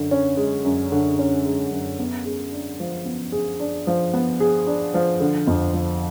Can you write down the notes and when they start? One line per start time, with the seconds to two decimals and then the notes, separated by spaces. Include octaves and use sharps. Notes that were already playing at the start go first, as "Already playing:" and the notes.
Already playing: F#2 D3
0.11 C#4
0.37 G#3
0.64 F#2
0.92 D3
1.19 C#4
1.46 G#3
1.71 F#2
1.99 B3
2.25 G#4
2.52 D4
2.80 F3
3.05 B3
3.32 G#4
3.60 D4
3.87 F3
4.14 B3
4.40 G#4
4.67 D4
4.94 F3
5.20 D3
5.47 F2
5.74 F3